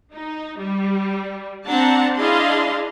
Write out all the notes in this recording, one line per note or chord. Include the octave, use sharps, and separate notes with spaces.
D#4
G3
C4 D4 F#5 A5 A#5
D4 E4 G#4 D#5 F5 C6